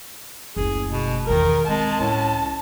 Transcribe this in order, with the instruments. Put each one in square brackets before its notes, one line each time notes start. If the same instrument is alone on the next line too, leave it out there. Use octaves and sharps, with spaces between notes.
[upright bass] F#1 D2 [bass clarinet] G#4
[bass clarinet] B2
[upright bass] B1 E2 [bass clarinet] D#3 [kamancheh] A#4
[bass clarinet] G#3 [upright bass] C4 [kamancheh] A5
[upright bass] C#2 [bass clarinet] A2